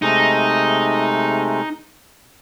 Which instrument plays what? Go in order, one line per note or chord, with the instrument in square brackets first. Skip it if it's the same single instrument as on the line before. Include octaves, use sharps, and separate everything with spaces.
[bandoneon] C3 G#3 A3 [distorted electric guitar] D#4